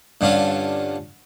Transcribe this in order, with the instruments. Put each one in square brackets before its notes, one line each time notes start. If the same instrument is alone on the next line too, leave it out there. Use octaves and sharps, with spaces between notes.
[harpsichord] G2 D3 C#4 F4